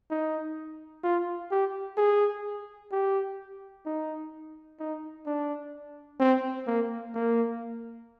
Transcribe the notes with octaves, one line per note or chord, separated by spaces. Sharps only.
D#4
F4
G4
G#4
G4
D#4
D#4
D4
C4
A#3
A#3